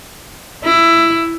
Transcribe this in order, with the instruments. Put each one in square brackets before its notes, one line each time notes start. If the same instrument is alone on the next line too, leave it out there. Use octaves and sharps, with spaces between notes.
[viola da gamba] E4